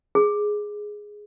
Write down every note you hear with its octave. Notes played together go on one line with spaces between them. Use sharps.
G#4